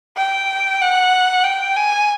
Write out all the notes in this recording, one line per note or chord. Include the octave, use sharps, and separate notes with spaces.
G5
F#5
G5
G#5